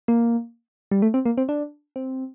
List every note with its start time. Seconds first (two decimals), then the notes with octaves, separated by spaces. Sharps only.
0.08 A#3
0.91 G3
1.02 A3
1.14 C4
1.25 A#3
1.38 C4
1.49 D4
1.96 C4